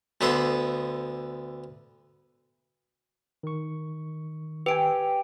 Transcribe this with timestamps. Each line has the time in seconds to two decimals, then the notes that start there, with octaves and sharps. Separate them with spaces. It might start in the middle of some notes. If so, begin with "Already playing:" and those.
0.21 D2 D3 B3 E5 C6
3.43 D#3 C#6
4.66 G4 B4 G5 G#5 D7